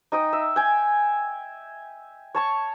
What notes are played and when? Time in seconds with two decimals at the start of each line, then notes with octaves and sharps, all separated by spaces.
0.12 D#4 D#5 G5 D#6
0.33 E5
0.56 G5 G#5
2.35 C#5 A5 C#6